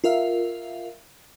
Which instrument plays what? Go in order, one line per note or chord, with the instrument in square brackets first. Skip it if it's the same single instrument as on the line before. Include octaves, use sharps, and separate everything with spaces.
[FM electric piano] F4 A#4 E5 F5